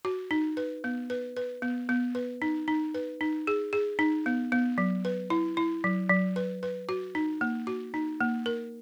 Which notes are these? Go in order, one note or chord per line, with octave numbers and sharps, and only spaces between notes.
F#4
D#4
B4
B3
B4
B4
B3
B3
B4
D#4
D#4
B4
D#4
G#4
G#4
D#4
B3
B3
F#3
B4
E4
E4
F#3
F#3
B4
B4
F#4
D#4
A#3
F#4
D#4
A#3
A#4